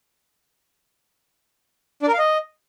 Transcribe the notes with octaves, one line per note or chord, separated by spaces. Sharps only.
D4
A#4
F5
D#5